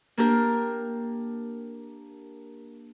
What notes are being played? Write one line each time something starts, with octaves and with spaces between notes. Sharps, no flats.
A#3 D4 G4 A#4